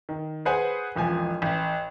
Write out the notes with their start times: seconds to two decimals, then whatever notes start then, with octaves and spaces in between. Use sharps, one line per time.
0.09 D#3
0.45 G#4 B4 C5 F#5 G#5
0.95 E1 A1 F3 G#5
1.42 A1